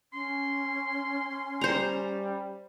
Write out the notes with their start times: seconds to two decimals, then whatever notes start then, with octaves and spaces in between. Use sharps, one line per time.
0.13 C#4 C6
1.61 G3 C5 A#5